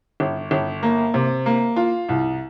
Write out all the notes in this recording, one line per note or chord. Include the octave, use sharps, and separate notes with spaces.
G1
G1
A#3
C3
A#3
F4
C2